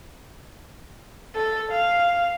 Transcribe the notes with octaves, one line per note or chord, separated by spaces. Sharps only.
A4
F5